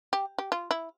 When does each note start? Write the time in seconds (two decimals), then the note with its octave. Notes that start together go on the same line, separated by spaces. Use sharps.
0.13 G4
0.38 G4
0.52 F4
0.71 E4